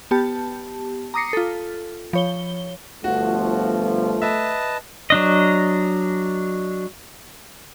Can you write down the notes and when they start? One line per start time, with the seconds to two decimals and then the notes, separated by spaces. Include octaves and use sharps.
0.11 B3 G4 A5
1.14 A#5 D6 D#6 A#6 C7 C#7
1.33 F4 A4
2.13 F3 C#5 G7
3.04 G1 F3 A3 F#4
4.22 B4 D#5 E5 A5
5.10 F#3 D4 D#5